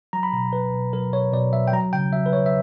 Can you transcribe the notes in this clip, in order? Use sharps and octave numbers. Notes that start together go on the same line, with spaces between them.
F#3 A#5
B5
B2 A#5
F#3 B4
B2
F#3 A#4
B2 C#5
B2 D5
F#3 E5
G5
F#3 A#5
C#3 G5
F#3 E5
B4
F#3 C#5
E5